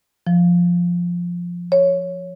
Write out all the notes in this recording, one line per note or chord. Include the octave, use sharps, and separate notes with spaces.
F3
C#5